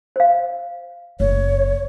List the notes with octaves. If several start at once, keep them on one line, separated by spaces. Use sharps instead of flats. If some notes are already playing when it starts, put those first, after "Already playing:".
C5 F5
F#1 C#5